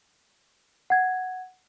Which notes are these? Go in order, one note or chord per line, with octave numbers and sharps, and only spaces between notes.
F#5 G#6